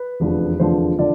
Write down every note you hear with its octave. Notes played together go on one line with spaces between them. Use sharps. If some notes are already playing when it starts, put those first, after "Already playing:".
Already playing: B4
F1 E2 D3 F3
F1 E2 D3 F3 C5
D3 F3 D5